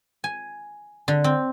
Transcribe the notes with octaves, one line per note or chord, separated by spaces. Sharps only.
G#5
D3
C4